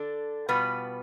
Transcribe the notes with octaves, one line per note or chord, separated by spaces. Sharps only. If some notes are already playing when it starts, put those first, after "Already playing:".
Already playing: D3 D4 A4
B2 G3 B3 F4 B4